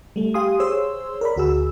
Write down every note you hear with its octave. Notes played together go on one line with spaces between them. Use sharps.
G3 A3
G4 F5 G#5 C6 D#6
G#4 C5 C#5 C6 E6
A#4 D5 B5
D2 F#4 G#4 E6